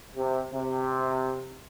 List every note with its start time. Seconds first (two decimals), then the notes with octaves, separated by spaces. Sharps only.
0.16 C3
0.54 C3